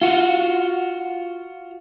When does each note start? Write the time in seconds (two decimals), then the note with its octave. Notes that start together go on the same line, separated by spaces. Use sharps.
0.02 F4 F#4